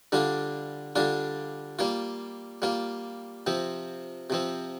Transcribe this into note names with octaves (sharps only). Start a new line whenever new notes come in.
D3 G3 D4 F4
D3 G3 D4 F4
G3 A#3 F4
G3 A#3 F4
C3 F3 C4
C3 F3 C4